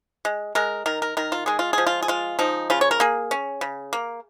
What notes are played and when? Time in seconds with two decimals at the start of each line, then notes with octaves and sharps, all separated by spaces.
0.25 G#3
0.55 G#3 A#4
0.86 D#3 A#4
1.02 A#4
1.17 D#3 A#4
1.32 F4
1.46 G#3 G#4
1.59 F4
1.73 F3 G#4
1.87 F4
2.03 G#4
2.08 G#3 F4
2.39 F3 D#4
2.70 C#3 F4
2.81 C#5
2.91 A#4
3.00 A#3 G#4
3.31 C#4
3.61 C#3
3.93 A#3